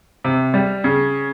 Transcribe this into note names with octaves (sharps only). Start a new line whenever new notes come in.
C3
G3
C#3